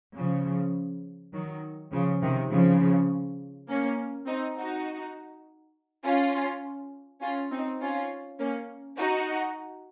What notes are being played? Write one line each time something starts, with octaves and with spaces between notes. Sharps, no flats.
C#3 F3
D#3 F#3
C#3 F3
C3 D#3
C#3 F3
A#3 C#4
C4 D#4
D#4 F#4
C#4 F4
C#4 F4
C4 D#4
C#4 F4
A#3 C#4
D#4 F#4